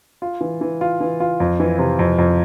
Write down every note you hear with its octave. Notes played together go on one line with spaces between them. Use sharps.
F4
E3
E3
F4
E3
F4
F2
E3
C3
F2
F2